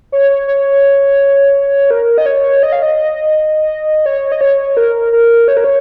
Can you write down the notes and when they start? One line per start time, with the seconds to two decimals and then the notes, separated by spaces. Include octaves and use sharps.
0.12 C#5
0.30 C#5
0.48 C#5
1.91 A#4
2.18 D#5
2.26 C#5
2.63 D#5
2.72 F5
2.82 D#5
4.06 C#5
4.32 D#5
4.41 C#5
4.77 A#4
5.13 A#4
5.48 C#5
5.57 A#4
5.64 C#5